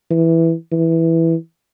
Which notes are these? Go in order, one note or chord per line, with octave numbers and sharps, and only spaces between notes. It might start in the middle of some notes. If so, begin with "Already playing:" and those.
E3
E3